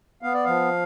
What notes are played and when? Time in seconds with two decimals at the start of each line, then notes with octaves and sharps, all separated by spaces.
0.22 B3 F5
0.34 D5
0.44 F3 F5